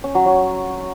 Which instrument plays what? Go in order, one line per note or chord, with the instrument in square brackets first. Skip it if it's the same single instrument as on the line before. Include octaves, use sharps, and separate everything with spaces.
[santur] C#4
F#3
F#3